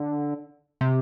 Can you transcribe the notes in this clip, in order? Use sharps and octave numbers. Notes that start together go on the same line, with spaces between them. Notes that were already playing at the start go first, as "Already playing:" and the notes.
Already playing: D3
C3